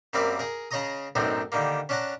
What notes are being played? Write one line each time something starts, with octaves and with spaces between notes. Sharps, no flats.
F#2 G3 A#3 C4 F5 B5
G#4 A#4
C#3 G#4 C#5 D#5 A#5 D#6
B1 F#2 A2 C4 D4 D#4
D3 D#3 G3 A#3
C#4 D4 C#5 F#5 A5 A#5